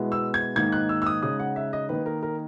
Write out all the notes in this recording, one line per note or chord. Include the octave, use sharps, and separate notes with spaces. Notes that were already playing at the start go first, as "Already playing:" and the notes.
Already playing: B2 G#3 B3 E4
E6
G#6
G#2 D#3 A#3 D#4 G#6
F#6
E6
E6
D#6
C#3 G#3 D#4 D#6
F#5
E5
D#5
D#3 A#3 D#4 B4
A#4
A#4